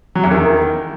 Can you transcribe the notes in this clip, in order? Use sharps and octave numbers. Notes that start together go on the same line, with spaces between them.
F#3
E2
D#3